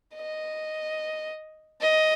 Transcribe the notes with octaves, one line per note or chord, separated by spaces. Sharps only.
D#5
D#5